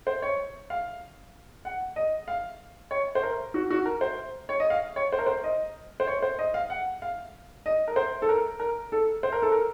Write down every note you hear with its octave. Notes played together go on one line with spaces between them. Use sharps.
C5
C#5
F5
F#5
D#5
F5
C#5
C5
A#4
F#4
F#4
A#4
C5
C#5
D#5
F5
C#5
C5
A#4
C5
D#5
C5
C#5
C5
D#5
F5
F#5
F5
D#5
A#4
C5
A4
A#4
A#4
A4
C5
A#4
A4
A#4